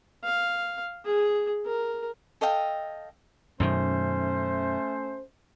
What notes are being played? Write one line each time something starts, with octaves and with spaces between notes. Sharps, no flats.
F5
G#4
A#4
A4 D#5 F5 G5
F#2 B2 D#3 A3 C#4 C5